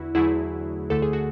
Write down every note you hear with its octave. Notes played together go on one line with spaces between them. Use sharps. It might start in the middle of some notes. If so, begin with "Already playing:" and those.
Already playing: E2 D3 E4 F#4
E2 D3 F#3 A3 E4 G#4
D2 D3 A3 A4
G#4
F#4